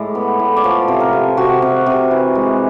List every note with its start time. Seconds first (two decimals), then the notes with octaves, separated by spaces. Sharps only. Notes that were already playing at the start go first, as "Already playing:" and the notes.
Already playing: A2 G#3 D5
0.15 B3
0.40 A2
0.56 D5
0.64 F3 C#5
0.88 C3
1.00 A#4
1.13 C3
1.37 C3 F#4
1.62 C3
1.86 C3
2.11 E3
2.35 G#3